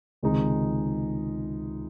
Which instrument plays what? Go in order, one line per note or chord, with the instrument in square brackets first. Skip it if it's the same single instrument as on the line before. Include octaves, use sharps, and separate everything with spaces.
[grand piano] C#2 C3 D#3 G#3 D#4